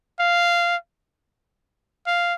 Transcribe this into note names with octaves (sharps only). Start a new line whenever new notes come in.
F5
F5